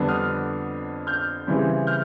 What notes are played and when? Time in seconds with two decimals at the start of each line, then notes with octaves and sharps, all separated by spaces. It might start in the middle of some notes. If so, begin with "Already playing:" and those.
Already playing: F2 D3 G3 B3 D4
0.08 D#6 F6
1.07 F6 G6
1.47 C#3 E3 G3 C4
1.87 F6 G6